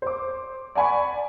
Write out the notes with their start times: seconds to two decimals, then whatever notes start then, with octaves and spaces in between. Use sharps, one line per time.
0.02 C5 D6
0.75 D5 F#5 G#5 B5 C#6